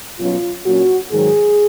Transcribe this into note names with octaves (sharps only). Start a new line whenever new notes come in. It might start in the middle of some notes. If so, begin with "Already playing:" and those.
B2 F#3 C#4 F4
A#2 F#3 C#4 F#4
G#2 D#3 F#3 G#4